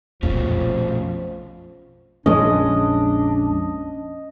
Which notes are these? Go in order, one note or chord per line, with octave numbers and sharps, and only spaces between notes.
A#1 F2 B2 F3 A3 C#4
A#1 F2 G#3 C#4 D4 D#5